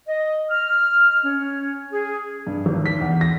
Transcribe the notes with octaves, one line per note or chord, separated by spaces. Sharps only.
D#5
F6
C#4
G#4
G2
G#1
B6
E2
A#6